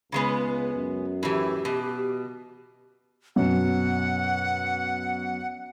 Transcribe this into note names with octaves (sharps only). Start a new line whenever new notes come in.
C#2 C#3 G#3 B3
F#2
A2 E3 G4
B2
F#2 B2 F#5